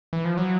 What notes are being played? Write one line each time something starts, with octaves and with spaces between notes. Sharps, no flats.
E3
F3
F#3